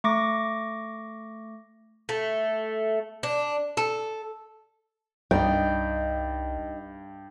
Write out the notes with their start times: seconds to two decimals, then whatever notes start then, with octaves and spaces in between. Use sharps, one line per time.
0.04 A3 C#6 D6 A#6
2.09 A3
3.23 D4
3.77 A4
5.31 C2 G2 D#4 D5 D#5 G5